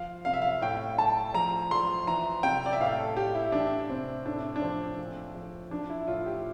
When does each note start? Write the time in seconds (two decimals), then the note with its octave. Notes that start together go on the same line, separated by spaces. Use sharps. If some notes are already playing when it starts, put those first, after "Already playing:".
Already playing: F3 F5
0.25 C3 F5
0.33 E5
0.42 F5
0.62 A2 G5
0.98 A2 A5
1.34 F3 A#5
1.71 F3 C6
2.07 E3 A#5
2.43 C3 G5
2.66 D5
2.73 E5
2.80 A2 F5
2.98 A4
3.16 A2 G4
3.35 E4
3.52 E3 D4
3.89 C3 C4
4.26 A2 D4
4.56 D4
4.61 F3 C4
4.98 A#2
5.35 F3
5.71 F3 D4
5.90 E4
6.08 A2 F4
6.26 G4